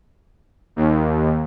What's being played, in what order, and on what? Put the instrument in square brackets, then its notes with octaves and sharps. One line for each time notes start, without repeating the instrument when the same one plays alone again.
[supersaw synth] D#2